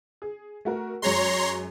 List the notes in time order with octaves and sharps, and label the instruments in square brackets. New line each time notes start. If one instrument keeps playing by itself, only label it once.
[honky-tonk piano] G#4
A3 F#4 A#4
[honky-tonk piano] F#2 G#3 [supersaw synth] C#5 A#5 C6